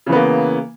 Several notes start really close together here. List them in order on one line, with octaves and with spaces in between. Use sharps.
C#3 E3 B3 A#3